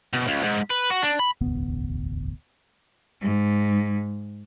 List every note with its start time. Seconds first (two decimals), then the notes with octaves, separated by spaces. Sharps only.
0.13 B2
0.27 C#2
0.43 G#2
0.70 B4
0.91 F#4
1.03 D4
1.20 B5
1.41 E1 A1 D2 B3
3.22 G#2